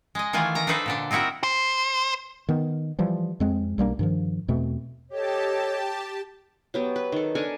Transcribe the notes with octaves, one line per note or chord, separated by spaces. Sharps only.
G#3 D#5
D#3 E3 A3 F4 G#5
D#3 A#5
D4 D#4 A4 B4 C5 E5
A#2 D3 D4
C4 D#4 E4 F#4 A#4
C5
D#3 B3
E3 F3 G3
F2 G#3 C4
B1 G3 A#3 D4
G2 D#3 F3
E2 B2 A3 C4
G4 A4 C#5 D#5 A5
F#3 B3 G4
B4
D#3 A4
D4 A4 A#4 G#5